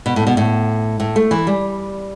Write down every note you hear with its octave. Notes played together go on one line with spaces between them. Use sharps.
B2
A2
B2
A2
A2
A3
E3
G3